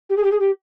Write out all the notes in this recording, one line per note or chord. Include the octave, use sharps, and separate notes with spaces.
G4
G#4
G4
G#4
G4